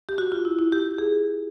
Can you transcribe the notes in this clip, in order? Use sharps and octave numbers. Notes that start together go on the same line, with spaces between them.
G4
F#4
F4
E4
E4
G4
G#4